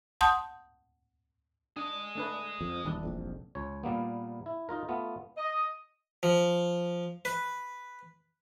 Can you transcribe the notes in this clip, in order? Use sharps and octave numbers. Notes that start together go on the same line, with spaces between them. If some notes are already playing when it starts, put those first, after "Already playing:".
F#5 A5 C6 D#6 G6
D4 G#4 D#5
A3 D4 B4
F2
D#1 E3 G3 D4
F1 A#1 F2
C#2 C#5
A#2 G3 A#3 B3
E4
D#4 F4 A#4
A3 B3 F4
D#5
F3
B4